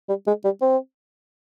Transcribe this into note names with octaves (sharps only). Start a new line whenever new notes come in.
G3
G#3
G3
C4